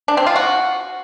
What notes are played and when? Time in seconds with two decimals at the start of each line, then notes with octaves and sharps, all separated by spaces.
0.08 D4
0.17 C4
0.26 F4
0.36 F#4